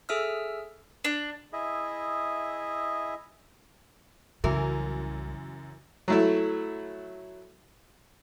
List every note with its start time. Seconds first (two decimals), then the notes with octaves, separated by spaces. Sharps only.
0.09 G#4 A4 E5 E6 F6
1.04 D4
1.53 E4 G#4 D#5 E5
4.44 C2 F#2 C#3 E3 A#4 G#5
6.08 F#3 A3 E4